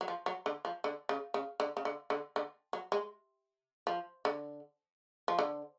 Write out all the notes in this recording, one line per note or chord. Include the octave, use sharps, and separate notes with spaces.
F#3
F3
F#3
D3
F3
D3
C#3
C#3
D3
C#3
D3
D3
D3
F#3
G#3
F3
D3
F3
D3